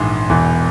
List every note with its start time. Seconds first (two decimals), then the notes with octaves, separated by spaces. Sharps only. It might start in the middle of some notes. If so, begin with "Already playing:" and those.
Already playing: A#1 G#2 E3 C6
0.29 E1 E2 E3